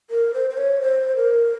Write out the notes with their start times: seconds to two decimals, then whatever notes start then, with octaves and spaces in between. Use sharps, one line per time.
0.10 A#4
0.34 C5
0.50 C5
0.57 C#5
0.81 C5
1.16 A#4